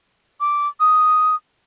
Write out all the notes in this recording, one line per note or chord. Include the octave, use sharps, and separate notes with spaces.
D6
D#6